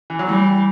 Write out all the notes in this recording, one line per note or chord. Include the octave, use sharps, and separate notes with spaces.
E3
F#3
E3 G3